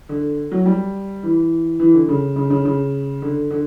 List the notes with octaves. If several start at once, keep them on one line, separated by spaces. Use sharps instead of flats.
D3
F#3
G3
E3
E3
D3
C#3
C#3
C#3
C#3
D3
D3